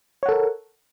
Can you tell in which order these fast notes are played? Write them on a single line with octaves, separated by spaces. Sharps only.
C#5 F#5 A4 A#4